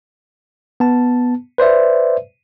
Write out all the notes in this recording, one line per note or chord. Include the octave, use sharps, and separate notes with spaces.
B3 A5
B4 C5 D5 E5